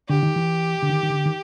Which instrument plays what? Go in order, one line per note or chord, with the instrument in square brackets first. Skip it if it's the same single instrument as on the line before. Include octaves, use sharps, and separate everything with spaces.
[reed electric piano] D3 [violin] G4
[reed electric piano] D#3
E3
D3
D#3
D#3
D3
D#3